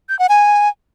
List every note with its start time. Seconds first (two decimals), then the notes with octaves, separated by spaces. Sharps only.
0.09 G6
0.19 F#5
0.29 G#5